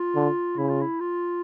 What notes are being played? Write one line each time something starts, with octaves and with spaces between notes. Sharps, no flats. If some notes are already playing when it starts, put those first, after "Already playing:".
Already playing: F4
D3
C#3 E4
F4
E4
F4